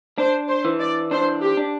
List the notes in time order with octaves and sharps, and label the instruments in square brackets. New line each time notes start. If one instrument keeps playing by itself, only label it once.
[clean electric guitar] D4 [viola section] C5
[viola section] C5
[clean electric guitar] E3
[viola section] D5
[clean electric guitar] D4 [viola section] C5
[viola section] G4
[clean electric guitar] D4